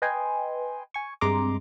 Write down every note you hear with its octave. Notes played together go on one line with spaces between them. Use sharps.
B4 D#5 G5 G#5 C6
G#5 C#6
G2 C3 G#3 A#5 C6 D6